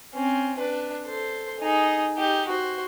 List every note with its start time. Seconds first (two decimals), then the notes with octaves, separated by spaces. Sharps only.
0.15 C4 C#4
0.58 D4 B4
1.05 A4 C5
1.60 D#4 G#4
2.16 D#4 G4
2.48 F#4 C5